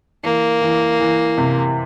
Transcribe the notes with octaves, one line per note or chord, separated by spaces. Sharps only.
E3 A#3
E3
E3
C3